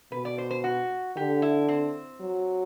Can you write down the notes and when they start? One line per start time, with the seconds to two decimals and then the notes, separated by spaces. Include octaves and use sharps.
0.12 B2 B4
0.25 D5
0.38 C5
0.51 C5
0.64 F#4
1.17 D3 G4
1.42 E4
1.68 C4
2.21 F#3